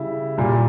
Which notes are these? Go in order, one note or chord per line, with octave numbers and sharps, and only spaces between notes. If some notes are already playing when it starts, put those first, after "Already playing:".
Already playing: C#3 G3 E4
A#2 G3